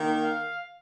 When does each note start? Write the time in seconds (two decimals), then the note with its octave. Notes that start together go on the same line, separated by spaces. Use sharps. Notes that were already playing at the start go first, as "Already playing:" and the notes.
Already playing: D#3 A#3
0.22 F5